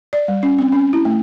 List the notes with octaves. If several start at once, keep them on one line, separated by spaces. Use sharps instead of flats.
D5
G3
C#4
C4
C#4
E4
A3